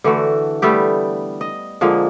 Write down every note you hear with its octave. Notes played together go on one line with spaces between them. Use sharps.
D3 E3 A3 F#4
G3 A3 B3 G4
D#5
D3 F3 G#3 A#3